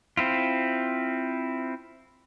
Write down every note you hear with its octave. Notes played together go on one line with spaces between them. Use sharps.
C4 E4 F4